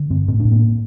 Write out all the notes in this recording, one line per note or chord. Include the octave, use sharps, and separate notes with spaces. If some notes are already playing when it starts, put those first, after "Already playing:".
Already playing: D3
G2 C4
A2 C4
D4
A2
A#3